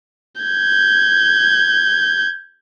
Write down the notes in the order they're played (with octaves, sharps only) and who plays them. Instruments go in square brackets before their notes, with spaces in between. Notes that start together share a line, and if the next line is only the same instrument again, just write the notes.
[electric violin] G6 G#6